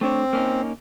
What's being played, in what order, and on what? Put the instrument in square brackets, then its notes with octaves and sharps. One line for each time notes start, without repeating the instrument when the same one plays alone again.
[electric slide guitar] A3 D4 C#5 [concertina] C4
[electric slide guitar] A#3 C#4 D#4